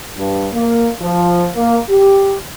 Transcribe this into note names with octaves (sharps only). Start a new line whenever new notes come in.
G2
A#3
F3
A#3
G4